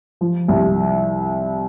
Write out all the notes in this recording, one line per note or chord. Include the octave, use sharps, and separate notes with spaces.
F3
C2